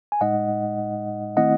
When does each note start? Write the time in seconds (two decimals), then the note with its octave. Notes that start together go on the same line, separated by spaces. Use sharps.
0.12 G#5
0.21 A2 G#3 D#4 D#5 F#5
1.37 D#3 A3 C4 E4 D#5 F#5